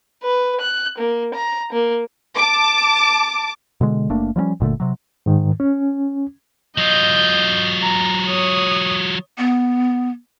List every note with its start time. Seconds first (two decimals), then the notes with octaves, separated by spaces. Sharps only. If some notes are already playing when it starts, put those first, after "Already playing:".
0.23 B4
0.60 F#6
0.98 A#3
1.34 A#5
1.72 A#3
2.35 A5 D6
3.81 B2 D3 G#3
4.10 F#1 A3 A#3 D4
4.36 F3 G3 A#3 C#4
4.60 F#1 A#2 D3 A3
4.80 C3 F#3
5.26 G#2 D#3
5.60 C#4
6.78 F#3 F4 D#5 G6
7.82 A#5
8.27 C#5 D#6
9.38 B3